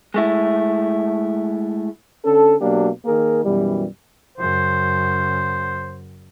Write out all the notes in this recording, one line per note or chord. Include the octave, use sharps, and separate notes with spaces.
G#3 A3 E4
D3 C#4 A4
B2 F#3 A#3 D4 G4
D#3 A#3 G#4 A#4
F#2 B2 E3 G3
F#2 C#3 C5